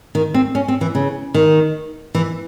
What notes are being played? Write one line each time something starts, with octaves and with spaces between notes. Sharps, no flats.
D#3
C4
C#4
C4
E3
C#3
D#3
E3